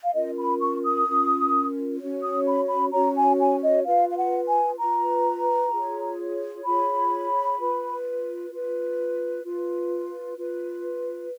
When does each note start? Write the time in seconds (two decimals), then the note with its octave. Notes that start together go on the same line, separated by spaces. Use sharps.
0.03 F5
0.13 C#4 F4 A#4 D#5
0.37 B5
0.60 C#6
0.83 D#6
1.07 C#4 F4 A#4
1.99 C#4 F#4 C#5
2.22 D#6
2.45 B5
2.69 B5
2.92 C#4 F#4 C#5 A#5
3.15 G#5
3.39 G#5
3.62 D#5
3.85 F4 B4 F5
4.09 F5
4.16 F#5
4.48 G#5
4.78 F4 B4 A#5
5.71 F4 G#4 C#5
6.64 F4 G#4 C#5 B5
7.58 F4 B4
8.50 F4 B4
9.44 F4 B4
10.37 F4 B4